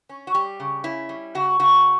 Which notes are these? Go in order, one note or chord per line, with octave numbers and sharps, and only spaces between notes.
C#4
F#4
G3 G4
C#3
C#4 E4
G3
C#3 F#4
C#3 F#4